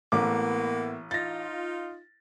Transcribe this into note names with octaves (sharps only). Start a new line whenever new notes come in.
A1 A2 A#3 B3 D6
D#4 F4 A6 A#6